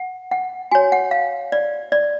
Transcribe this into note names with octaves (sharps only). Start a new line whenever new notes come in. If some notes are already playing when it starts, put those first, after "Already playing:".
Already playing: F#5
F#5
F#4 C#5 G#5
F#5
F5
D5
D5